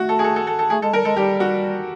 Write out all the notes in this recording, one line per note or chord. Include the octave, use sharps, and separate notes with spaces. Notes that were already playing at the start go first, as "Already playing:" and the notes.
Already playing: A3 F#4
A4
G#4
A4
A4
A4
A4
A3 G#4
G#3 A4
G3 A#4
G#3 A4
G3 G4
F#4